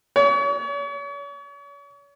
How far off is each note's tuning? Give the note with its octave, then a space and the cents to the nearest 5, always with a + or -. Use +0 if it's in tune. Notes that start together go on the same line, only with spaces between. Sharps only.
C#5 +40